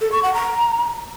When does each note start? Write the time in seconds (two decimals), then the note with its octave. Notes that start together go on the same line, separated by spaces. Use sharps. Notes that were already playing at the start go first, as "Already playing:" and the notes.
0.01 A4
0.12 C#6
0.23 F#5
0.34 A#5